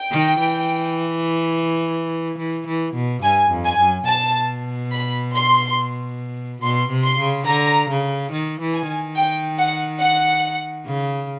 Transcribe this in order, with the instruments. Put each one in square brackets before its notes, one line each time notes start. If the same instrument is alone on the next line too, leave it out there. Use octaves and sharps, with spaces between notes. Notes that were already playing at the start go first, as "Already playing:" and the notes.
Already playing: [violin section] G5
[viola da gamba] D#3
E3
E3
E3
B2
[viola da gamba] G2 [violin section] G#5
[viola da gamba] F2
[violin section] G#5
[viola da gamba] F#2
[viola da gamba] B2 [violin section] A5
[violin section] B5
C6
[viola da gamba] B2 [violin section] C6
[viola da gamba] C3
[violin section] C6
[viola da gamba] C#3
[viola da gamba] D3 [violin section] A#5
[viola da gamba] C#3
D#3
E3
[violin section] G#5
[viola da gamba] D#3
[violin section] G5
F#5
F#5
[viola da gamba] C#3